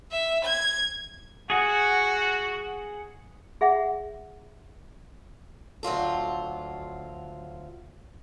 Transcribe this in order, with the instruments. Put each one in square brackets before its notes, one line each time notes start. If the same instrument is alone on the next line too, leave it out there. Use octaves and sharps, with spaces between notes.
[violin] E5
G#6
[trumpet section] F#4 [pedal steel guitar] G#4 F#5
[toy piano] G#4 E5 F#5
[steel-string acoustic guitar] D2 F#3 F4 A4